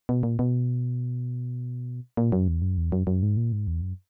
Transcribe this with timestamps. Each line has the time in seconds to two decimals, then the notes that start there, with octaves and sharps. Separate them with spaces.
0.09 B2
0.23 A#2
0.39 B2
2.17 A#2
2.32 F#2
2.48 E2
2.62 F#2
2.78 E2
2.92 F#2
3.07 F#2
3.23 G#2
3.37 A#2
3.52 G#2
3.67 E2
3.82 F#2